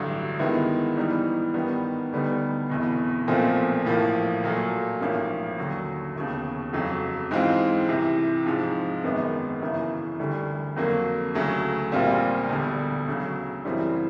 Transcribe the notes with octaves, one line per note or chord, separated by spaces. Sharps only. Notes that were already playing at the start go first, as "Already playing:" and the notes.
Already playing: A1 G2 D3 F#3
G2 D#3 G#3 B3 E4
G#2 E3 G3 B3 D#4
G2 D#3 G3 B3 D#4
D2 D3 G3 B3 D#4
F1 E2 B2
B1 A#2 F3 A3 C4
A1 A2 F3 A#3
A#2 F#3 A3
A1 G#2 F3 A#3 C#4
D#2 D3 F#3
E1 D#2 C#3
F1 F2 C#3 F#3
G#2 E3 G#3 C4 F4
C2 C3 E3
G#2 F3 G#3
G#1 F#2 D#3 G#3 B3
G1 F#2 C#3 E3
D2 D3 G3
F2 D3 F#3 A#3
D2 C#3 F#3 A3
A#1 A#2 G3 C4 F4
E1 D2 D3 G3
D2 C#3 F#3
F#2 C#3 E3 G3 C4